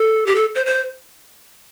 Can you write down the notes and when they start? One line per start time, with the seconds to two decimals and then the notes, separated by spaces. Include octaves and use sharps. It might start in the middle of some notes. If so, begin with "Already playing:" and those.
Already playing: A4
0.26 G4
0.35 A4
0.55 C5
0.66 C5